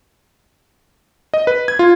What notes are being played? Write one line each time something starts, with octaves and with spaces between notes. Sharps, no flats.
D#5
B4
G#6
F4